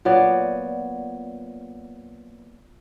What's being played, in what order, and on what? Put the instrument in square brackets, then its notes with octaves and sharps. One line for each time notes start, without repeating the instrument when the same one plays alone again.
[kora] A#2 F#3 B3 D5